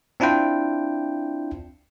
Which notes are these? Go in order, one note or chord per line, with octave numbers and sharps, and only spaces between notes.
C4 D4 E4 F4 G5